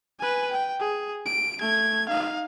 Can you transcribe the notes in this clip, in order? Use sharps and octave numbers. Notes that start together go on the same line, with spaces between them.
B4 G#5
G5
G#4
D7
A3 G#6
D#4 F5